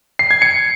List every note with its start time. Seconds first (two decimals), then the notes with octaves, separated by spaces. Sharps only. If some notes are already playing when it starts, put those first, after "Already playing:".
0.19 C7
0.31 G#6
0.42 C#7